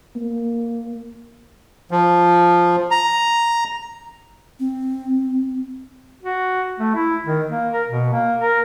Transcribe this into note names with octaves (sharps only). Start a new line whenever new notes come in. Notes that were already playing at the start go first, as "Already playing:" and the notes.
A#3
F3
A#5
C4
F#4
A3
E4
D#3
A#3
A#4
B2
A#3
A#4